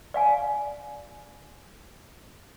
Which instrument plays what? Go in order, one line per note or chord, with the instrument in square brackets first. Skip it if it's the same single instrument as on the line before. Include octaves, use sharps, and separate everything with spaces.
[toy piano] D5 F5 G#5